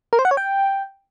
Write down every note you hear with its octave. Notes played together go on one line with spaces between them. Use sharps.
A#4
C5
F#5
C#5
G5